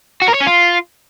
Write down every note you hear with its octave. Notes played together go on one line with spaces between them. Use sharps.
F#4
A#4
C#5
C#4
F4